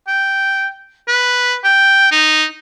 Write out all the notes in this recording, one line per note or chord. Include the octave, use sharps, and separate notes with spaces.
G5
B4
G5
D#4